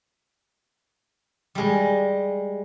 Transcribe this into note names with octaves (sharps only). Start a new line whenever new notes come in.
G3 G#3